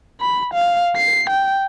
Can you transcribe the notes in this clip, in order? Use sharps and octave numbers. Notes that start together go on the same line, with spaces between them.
B5
F5
C7
G5